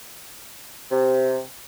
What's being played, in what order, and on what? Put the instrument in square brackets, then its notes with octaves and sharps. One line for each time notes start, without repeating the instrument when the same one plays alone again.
[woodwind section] C3